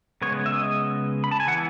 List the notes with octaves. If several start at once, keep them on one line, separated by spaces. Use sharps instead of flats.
C#3 G#3 B3 C#5
E5
D#5
B5
A5
G#5
E3 B3 F#5